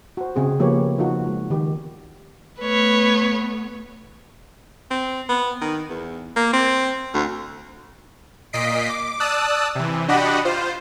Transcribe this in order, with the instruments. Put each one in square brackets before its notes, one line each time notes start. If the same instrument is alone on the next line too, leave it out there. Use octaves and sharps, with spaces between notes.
[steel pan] F#4 C5
C#3 C4 G#4
F3 A#3 B3 G4 B4 C#5
F3 D#4 F4 F#4
G#3
D#3 G4
[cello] A3 B3 [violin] B4 C#5
[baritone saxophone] C4
B3
D#3
E2
A#3
C4
D2
[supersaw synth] A#2 D#5 B6 C7 D7
D6
D5 A5 D#6 E6 F#6
C3 E3
D4 F#4 G4 D#5 F#5 B5
F4 C5